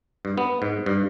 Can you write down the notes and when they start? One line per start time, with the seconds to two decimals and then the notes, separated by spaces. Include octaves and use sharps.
0.25 G2
0.38 B3
0.62 G#2
0.86 G2